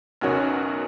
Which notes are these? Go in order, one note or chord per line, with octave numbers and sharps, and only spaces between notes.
B1 E2 C#3 F#4 A#4 C#5